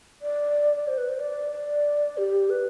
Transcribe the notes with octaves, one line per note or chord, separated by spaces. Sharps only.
D5
D5
C5
B4
C5
D5
D5
G4
B4